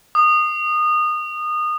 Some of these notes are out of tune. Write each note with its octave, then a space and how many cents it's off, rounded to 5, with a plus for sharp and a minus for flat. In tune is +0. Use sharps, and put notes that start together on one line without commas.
D#6 -25